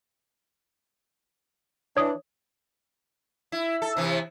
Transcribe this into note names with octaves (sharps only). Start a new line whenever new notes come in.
E3 D4 C#5 D#6
E4
A4
C3 E3